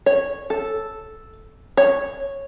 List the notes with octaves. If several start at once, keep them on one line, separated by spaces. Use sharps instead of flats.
C#5
A4
C#5